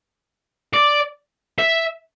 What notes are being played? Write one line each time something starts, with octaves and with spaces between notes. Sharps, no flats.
D5
E5